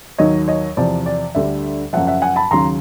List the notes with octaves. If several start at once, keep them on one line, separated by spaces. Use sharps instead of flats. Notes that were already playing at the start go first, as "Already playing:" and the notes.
D#2 D#3 F#3 C#5 D#5
C#5 D#5
E2 C3 F3 D5
D5
D2 D3 G3 D5 E5
F#2 C#3 F3 E5 F#5
E5 F#5
F#5 G#5
A5 B5
D#2 C#3 F#3 A#5 C6